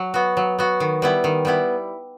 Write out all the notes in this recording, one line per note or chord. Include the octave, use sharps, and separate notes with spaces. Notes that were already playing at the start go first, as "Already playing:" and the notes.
Already playing: F#3
B3 F#4
F#3
B3 F#4
D#3
G3 B3 E4
D#3
G3 B3 E4